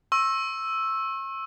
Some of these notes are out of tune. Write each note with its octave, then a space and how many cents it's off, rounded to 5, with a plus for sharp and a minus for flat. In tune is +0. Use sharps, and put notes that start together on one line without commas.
C#6 -40 E6 +0